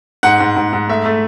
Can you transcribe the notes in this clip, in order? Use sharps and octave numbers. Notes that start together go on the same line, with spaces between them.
G#2 F#5
G#2
G#2
G#2
A3 E5
A3